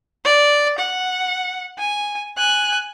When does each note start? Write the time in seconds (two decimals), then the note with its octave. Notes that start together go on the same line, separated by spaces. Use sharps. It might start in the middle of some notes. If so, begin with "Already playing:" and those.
0.25 D5
0.79 F#5
1.79 G#5
2.37 G#5 F#6